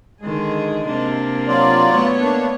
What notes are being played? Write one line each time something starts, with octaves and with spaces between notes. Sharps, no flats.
D3 D#3 G#3 G#4
C3 A#3 D4
F#3 F4 D5
A3 B3 C#5
A#3 D4